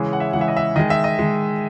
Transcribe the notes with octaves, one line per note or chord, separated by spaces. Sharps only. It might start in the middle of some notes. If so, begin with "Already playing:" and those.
Already playing: C#3 E3 G#3 C#5
F#5
E5
C#3 E3 G#3 F#5
E5
D#5
E5
D#3 G#3 D#5
E5
D#5
D#3 G#3